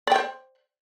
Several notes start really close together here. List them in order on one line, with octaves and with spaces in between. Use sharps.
D5 G5 C5